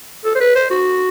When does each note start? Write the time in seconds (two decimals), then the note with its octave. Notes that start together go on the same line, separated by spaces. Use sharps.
0.25 A4
0.35 C5
0.40 B4
0.55 C5
0.70 F#4